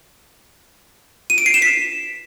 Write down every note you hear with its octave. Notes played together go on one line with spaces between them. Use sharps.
D#7
D7
C7
E7
B6